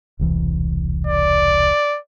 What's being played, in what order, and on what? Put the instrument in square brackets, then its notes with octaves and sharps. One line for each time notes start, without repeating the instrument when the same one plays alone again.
[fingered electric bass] E1 C2 E3
[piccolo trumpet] D5